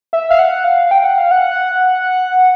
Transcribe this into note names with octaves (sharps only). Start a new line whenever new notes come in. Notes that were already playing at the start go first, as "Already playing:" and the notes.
E5
F5
F#5
F5
G5
F#5
F5
F#5